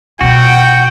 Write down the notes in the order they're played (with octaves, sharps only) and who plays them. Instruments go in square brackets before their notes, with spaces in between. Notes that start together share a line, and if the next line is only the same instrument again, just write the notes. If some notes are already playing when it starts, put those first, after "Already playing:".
[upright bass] B2 F4 [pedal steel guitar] F#4 [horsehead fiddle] F#5 [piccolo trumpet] G5